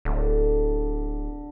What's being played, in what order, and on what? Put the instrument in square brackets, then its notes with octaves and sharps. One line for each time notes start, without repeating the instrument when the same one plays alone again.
[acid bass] D1 [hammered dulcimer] D3